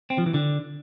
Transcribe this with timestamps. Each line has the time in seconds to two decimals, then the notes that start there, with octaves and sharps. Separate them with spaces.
0.10 C4
0.18 F3
0.26 E3
0.34 D3